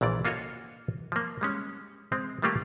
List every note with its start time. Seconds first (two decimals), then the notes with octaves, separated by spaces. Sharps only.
0.01 A#1 A#2 E3 D5
0.25 A#3 F4 F#4 A4 C#5 D#5
1.12 F3 A#3
1.41 G3 G#3 C#4
2.12 G#3 C4
2.42 D#3 G3 A3 A#3 F4 G4